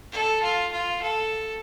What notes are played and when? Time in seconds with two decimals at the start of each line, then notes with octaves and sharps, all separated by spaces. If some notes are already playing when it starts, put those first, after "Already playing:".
0.12 A4
0.42 F4
0.72 F4
1.02 A4